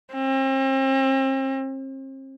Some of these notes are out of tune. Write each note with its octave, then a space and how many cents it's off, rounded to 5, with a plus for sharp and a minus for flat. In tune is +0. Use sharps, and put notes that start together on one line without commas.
C4 +40